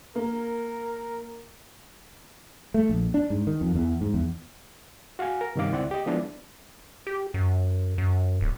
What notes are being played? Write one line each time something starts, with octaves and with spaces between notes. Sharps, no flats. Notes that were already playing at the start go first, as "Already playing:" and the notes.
A#3 A#4
A3
A#1
D4
G#2
D#3
F2
E2
G#2
E2
F#4 F5 F#5 G#5
A#4
G2 C3 D#3 C#4 F5 D6
C#2 C4 E4 D5 F#5
G4 D#5
F3 G#3 B3 D4 E4
G4
F#2
F#2
D1